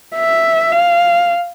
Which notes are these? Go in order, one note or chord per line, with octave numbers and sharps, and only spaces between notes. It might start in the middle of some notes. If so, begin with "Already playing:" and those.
E5
F5